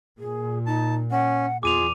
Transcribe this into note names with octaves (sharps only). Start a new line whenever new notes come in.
A#2 G#4
D#4 A5
C#4 F#5
E2 F4 G#4 D6 D#7 F7